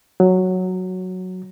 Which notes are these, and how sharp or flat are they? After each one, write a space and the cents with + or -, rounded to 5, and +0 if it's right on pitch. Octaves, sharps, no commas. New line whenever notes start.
F#3 -5